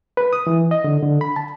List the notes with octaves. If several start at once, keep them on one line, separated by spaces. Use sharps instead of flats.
B4
D#6
E3
D#5
D3
D3
B5
A5